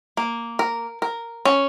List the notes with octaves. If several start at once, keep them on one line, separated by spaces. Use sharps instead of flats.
A#3
A#4
A#4
C#4